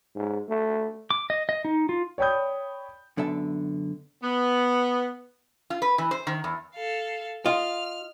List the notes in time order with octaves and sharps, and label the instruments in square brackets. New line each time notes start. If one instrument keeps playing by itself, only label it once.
[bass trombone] G#2
A3
[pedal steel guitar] D6
D#5
D#5
D#4
F4
[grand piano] C#5 D5 G5 B5 D#6 G6
[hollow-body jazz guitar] F#2 D3 B3 E5 A5
[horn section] B3
[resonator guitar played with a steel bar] F4
B4
E3
C5
D#3
E2
[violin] A4 F5
[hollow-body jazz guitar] F4 [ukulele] D#5 [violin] F6